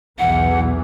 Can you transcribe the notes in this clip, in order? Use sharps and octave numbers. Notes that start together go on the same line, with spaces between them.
B1 E2 E3 F#5